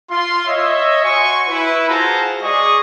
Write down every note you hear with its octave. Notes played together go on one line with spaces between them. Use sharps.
F4 C6
C#5 D#5 E5
F#4 G#5 C6 C#6
E4 B4
F4 F#4 G#4 C5 A5 A#5
G#3 G#4 D5 D#5 C#6 D#6